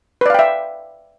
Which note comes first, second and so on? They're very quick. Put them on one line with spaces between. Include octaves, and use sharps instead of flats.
B4 D5 F5 G5 E5